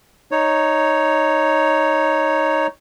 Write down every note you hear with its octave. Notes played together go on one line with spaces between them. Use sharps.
D#4 C#5